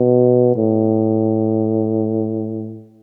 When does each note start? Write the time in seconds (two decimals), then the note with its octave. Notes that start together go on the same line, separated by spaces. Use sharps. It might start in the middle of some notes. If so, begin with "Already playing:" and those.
Already playing: B2
0.56 A2